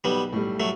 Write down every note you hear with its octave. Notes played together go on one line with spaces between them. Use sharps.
B1 G3 B3
A2 G3
F#3 A3